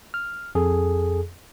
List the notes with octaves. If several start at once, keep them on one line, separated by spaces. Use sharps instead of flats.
F6
F2 G#4 A4